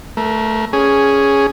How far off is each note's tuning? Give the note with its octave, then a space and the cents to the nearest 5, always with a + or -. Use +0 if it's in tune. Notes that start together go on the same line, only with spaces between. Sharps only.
A3 +0 A#4 +25
C#4 +5 G#4 +0